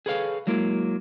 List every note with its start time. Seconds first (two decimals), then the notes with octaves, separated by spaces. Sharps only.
0.06 G#4 A4 B4 C#5 F5
0.47 F#3 G#3 A#3 E4